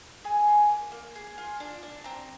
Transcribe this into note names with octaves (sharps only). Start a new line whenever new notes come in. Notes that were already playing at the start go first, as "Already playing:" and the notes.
G#4 G#5
F4
A#3
A#3
G#4
F4
D4
D4
C4 A#5